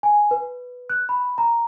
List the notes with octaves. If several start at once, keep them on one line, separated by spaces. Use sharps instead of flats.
G#5
B4
F#6
B5
A#5